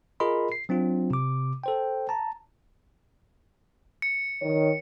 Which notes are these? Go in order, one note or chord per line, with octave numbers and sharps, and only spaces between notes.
F4 G#4 A#4 D#5 B5 C6
C7
F#3 C4 D4 F4
C3 D6
A4 C5 G5
A5 A#5
C#7
D#3 C#5